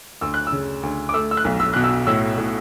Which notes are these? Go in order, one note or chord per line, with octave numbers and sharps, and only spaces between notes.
D2 E6
F#6
E6
C#3
D2
D6
A3 E6
E6
F#6
B1
E6
B2 F#6
E6
A2 E6
A2